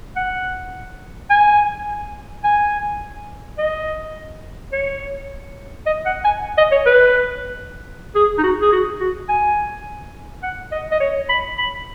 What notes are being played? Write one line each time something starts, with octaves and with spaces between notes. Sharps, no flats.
F#5
G#5
G#5
D#5
C#5
D#5
F#5
G#5
D#5
C#5
B4
G#4
D#4
F#4
G#4
F#4
F#4
G#5
F#5
D#5
D#5
C#5
B5
B5